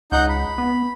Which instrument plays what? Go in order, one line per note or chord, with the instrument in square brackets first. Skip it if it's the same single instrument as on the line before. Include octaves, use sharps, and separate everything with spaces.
[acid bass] C#2 [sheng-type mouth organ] D#4 F#5 G6
[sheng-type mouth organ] B5
[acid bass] B3